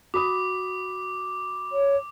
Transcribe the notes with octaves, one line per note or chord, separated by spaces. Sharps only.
F#4 B5 D6 D#6
C#5